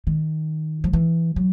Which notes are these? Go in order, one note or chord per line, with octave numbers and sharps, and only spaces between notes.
D#3
F3
E3
F#3